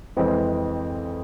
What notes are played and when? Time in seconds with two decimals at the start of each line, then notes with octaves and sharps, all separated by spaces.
0.17 F2 E3 G#3 C4